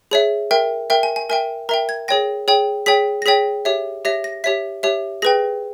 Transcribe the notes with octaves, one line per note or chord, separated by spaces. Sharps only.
G#4 C#5 E5
A#4 E5 G5
A#4 E5 G5
G#5
G#5
A#4 E5 G5 G#5
A#4 E5 G5 A#5
G#6
G#4 C#5 G5 A#6
G#4 C#5 G5
G#4 C#5 G5 B6
A#6
G#4 C#5 G5 B6
G4 C#5 E5
G4 C#5 E5 A#6
A#6
G4 C#5 E5 B6
G4 C#5 E5
G#4 B4 G5 A#6